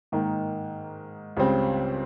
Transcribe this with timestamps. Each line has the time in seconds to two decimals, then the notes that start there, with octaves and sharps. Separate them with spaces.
0.12 G#2 D#3 A#3 D#4
1.37 C#2 C#3 G3 C4